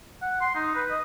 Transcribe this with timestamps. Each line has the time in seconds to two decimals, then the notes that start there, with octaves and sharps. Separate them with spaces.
0.22 F#5
0.41 C6
0.55 D#4
0.75 B4
0.91 D#5